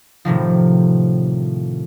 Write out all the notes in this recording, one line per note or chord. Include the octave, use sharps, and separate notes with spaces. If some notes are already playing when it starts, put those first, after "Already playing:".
A2 C3 D#3 F3